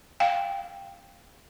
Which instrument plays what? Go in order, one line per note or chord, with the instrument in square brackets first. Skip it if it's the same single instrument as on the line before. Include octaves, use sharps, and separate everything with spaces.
[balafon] F5 G5